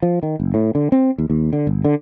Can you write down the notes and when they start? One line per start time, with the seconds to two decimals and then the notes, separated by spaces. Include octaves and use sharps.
0.02 F3
0.23 D#3
0.40 F#1
0.54 A2
0.75 D3
0.92 C4
1.18 D#2
1.30 D#2
1.53 D3
1.67 G1
1.85 D3